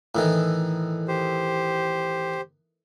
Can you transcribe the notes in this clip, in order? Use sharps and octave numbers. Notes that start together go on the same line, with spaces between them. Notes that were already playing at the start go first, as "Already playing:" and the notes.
A2 D#3 E3
G4 C5